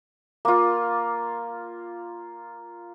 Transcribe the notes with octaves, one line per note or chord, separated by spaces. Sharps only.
A#3 F4